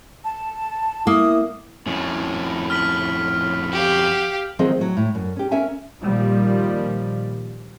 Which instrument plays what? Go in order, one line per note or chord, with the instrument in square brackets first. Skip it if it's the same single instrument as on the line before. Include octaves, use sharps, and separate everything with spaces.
[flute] A5
[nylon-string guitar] A#3 [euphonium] E4 [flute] D#6
[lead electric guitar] F2 C#4 [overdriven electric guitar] A2
[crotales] F6 B6 F#7
[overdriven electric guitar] F#4 [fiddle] G4 F5
[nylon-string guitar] D#3 F3 F#3 C4 G#4 D#5
A2 F#3
A2
F#2
C#4 G4
C#4 A#4 E5 G#5
[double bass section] A#2 D#3 F3 G3